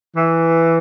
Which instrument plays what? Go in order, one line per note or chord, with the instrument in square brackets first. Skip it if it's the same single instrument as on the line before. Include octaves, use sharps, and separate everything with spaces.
[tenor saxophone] E3